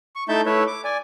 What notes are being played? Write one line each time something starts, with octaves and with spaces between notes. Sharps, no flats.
C#6
A3 D#4 E4 E5 A5 G6
A3 E4 B4 C#5 E5
D6
D5 G#5